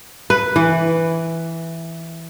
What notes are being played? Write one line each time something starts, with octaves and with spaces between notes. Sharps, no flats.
B4
E3